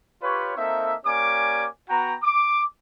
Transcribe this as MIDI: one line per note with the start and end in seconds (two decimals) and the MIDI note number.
0.23 0.54 65
0.23 0.54 67
0.23 0.54 71
0.23 0.54 73
0.57 0.94 58
0.57 0.94 60
0.57 0.94 63
0.57 0.94 69
0.57 0.94 76
1.06 1.67 58
1.06 1.67 61
1.06 1.67 67
1.06 1.67 74
1.06 1.67 80
1.06 1.67 86
1.89 2.15 59
1.89 2.15 66
1.89 2.15 79
1.89 2.15 82
2.22 2.62 86